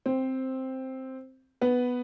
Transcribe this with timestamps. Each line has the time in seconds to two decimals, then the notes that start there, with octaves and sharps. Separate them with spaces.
0.06 C4 C5
1.61 B3 B4